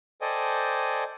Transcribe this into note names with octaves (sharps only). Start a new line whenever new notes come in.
A4 C5 D5 D#5 G5 G#5